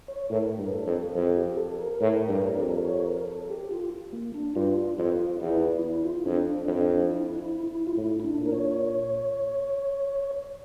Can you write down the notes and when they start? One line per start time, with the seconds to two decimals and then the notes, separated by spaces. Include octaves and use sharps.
0.08 C#5
0.30 A2 A#4
0.58 G2
0.66 A#4
0.72 A4
0.86 F2
0.93 A4
1.15 F2
1.37 G4
1.57 A4
1.79 A#4
2.01 A2
2.28 G2
2.57 F2 G4
2.69 A4
2.77 A#4
2.85 C#5
3.06 A#4
3.28 A4
3.50 G4
3.71 F4
4.13 A#3
4.34 D4
4.55 G2 F4
4.98 F2 F4
5.40 E2 E4
5.61 E4
5.83 E4
6.05 F4
6.26 F2 D4
6.68 F2
7.11 E4
7.39 E4
7.67 E4
7.87 F4
7.97 A2 E4
8.20 E4
8.25 D4
8.38 A#2
8.46 A#4
8.52 C#5